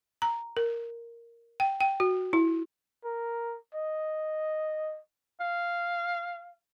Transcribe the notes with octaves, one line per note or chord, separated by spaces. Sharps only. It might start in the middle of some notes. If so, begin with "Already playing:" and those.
A#5
A#4
G5
G5
F#4
E4
A#4
D#5
F5